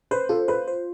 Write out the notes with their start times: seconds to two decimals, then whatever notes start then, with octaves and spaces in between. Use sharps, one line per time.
0.11 B4 C5
0.29 F4 A4
0.48 B4 C5
0.68 C5